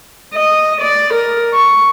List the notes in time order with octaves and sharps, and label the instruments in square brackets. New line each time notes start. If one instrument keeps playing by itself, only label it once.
[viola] D#5
D5
A#4
C#6